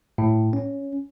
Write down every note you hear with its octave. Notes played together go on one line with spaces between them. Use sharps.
A2
C#4